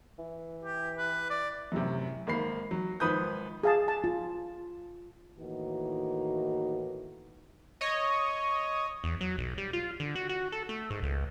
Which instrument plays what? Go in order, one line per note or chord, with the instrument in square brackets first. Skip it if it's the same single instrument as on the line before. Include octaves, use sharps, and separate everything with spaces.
[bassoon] E3
[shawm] G4
B4
D5
[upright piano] F#2 A2 C3
G#1 A#3 B5 C7
F#3
G#1 F3 B4 D#6 G6
[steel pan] G#4 F5 A5
A5
[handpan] F4
[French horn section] A2 D#3 E3 A#3 D#4 F#4
[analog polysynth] C#5 D#5
[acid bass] E2
F#3
B1
G3
F4
D3
F#4
F#4
A4
A3
G#2
C#2